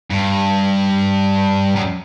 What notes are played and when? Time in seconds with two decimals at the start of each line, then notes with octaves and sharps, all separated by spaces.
0.10 G2
1.76 F#2